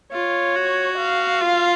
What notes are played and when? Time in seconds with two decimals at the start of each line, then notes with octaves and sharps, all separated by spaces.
0.12 F4 C#5
0.56 F#4
0.98 F5
1.41 F4